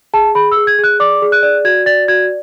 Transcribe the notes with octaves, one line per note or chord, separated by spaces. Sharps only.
G#4 A5
G#4 B5
E6
G#4
G#6
G#4 F#6
D5 D6
G#4
F#6
D5
F#4 G#6
D5 A6
F#4 G#6